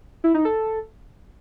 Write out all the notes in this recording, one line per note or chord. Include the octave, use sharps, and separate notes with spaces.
E4
D#4
A4